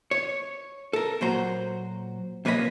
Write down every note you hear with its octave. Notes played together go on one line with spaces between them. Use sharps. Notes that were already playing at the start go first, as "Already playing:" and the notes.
C#5
A4 A#4
A#2 F#3 F#4 C5 A#5
F2 A#3 B4 C#5 D#5 B5